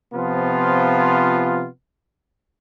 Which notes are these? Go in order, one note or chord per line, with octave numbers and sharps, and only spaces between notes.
C3 F3 B3 F4